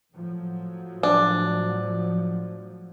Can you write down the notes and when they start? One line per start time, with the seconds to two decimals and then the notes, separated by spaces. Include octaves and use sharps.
0.13 A2 F3 F#3
1.03 D4